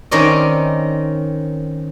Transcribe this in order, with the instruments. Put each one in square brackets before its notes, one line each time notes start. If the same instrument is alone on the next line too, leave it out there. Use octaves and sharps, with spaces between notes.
[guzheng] D#3 C4 C#4 A#4 D5 D#5